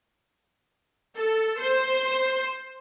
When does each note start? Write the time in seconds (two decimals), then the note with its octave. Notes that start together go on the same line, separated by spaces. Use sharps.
1.15 A4
1.60 C5